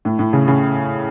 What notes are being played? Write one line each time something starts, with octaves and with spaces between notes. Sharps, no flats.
A2
A2
C#3
C#3